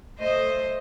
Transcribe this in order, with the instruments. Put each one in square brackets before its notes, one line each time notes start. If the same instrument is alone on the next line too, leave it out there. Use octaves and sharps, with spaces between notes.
[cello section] A3 D#5 [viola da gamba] C5